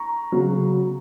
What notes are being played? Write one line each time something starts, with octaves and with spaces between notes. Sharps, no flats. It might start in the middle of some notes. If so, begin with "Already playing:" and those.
Already playing: A#5 C#6
C#3 F#3